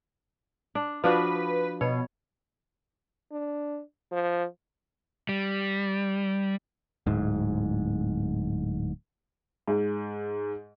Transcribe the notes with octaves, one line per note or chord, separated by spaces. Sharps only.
D4
F3 D4 F#4 B4
B2 C#5
D4
F3
G3
D1 G#2
G#2